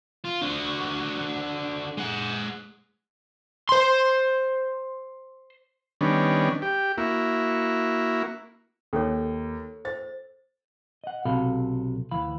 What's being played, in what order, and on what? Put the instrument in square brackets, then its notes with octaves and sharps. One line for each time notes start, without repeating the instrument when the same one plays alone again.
[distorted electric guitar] F4
D3 F#4
G#3 F#5
[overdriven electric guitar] C5 C6
[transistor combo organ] D#3 G3 B3 C#4 D4
G4
A#3 E4 F#4
[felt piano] D#2 [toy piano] A4 C#5
[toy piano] C5 [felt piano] A6
[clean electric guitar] D#5 F#5
B1 C3 F#4 A4 F5 B5
D2 E3 F5 B5